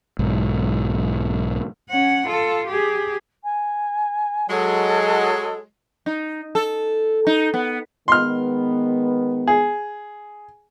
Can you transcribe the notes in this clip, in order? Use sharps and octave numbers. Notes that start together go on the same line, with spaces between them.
B1 G#2
C#4 F#5
F4 A4
G4 G#4
G#5
F#3 G#3 A4
D#4
A4
D#4
B3
D#3 G#3 B3 C6 F6
G#4